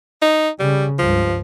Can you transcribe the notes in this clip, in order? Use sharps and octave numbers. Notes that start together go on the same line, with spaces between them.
D#4
C#3 G3
C#2 G2 F3